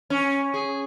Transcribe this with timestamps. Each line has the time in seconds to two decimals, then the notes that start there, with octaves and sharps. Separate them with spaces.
0.10 C#4
0.54 G#4